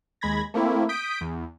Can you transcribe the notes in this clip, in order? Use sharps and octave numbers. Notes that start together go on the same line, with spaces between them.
D#2 G#3 B5 G#6 A#6
A3 A#3 C4 E4
D#6 G6 B6 D7
E2